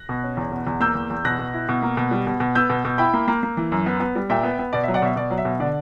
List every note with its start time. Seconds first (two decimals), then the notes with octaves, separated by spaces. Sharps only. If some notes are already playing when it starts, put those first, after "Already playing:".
Already playing: F#6 A#6
0.09 B2
0.23 C#4
0.37 E2
0.52 B2
0.67 E2
0.80 A#3 E6 G6
0.95 E2
1.10 E2
1.25 B2 F#6 A#6
1.39 B2
1.54 E4
1.69 B2
1.82 A#3
1.97 B2
2.11 G3
2.27 B2
2.40 B2
2.55 B3 E6 G6
2.70 B2
2.85 B2
2.98 E4 G5 B5
3.14 A#3
3.28 A#3
3.43 A#3
3.57 E3
3.72 F#2
3.86 B3
4.00 B3
4.16 G3
4.30 A#2 E5 G5
4.43 B3
4.59 B3
4.73 B2 D5
4.83 E5
4.88 F#3
4.94 D5 F#5
5.02 B2 E5
5.16 B2 D5
5.31 F#3
5.38 E5
5.45 B2
5.60 D3 D5